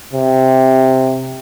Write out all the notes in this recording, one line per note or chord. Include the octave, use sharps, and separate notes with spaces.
C3